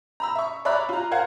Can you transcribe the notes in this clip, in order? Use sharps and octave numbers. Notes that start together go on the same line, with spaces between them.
A#5 B5 E6
E5 C#6
C#5 D5 E5 A#5 B5 F#6
F4 A#5
A#4 C5 F5 F#5 G#6